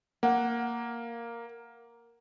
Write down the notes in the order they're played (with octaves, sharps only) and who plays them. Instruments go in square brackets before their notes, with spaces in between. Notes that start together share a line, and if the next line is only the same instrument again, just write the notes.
[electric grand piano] A#3 [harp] F#5